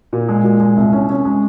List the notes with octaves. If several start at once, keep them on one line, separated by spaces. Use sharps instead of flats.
A#2
G#3
A#2
G#3
C2
C#4
C#4
G#3